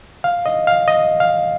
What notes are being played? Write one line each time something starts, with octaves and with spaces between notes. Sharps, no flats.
F5
D#5
F5
D#5
F5